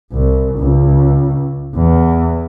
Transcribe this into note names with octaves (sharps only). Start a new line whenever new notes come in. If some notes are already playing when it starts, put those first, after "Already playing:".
C2
C#2
E2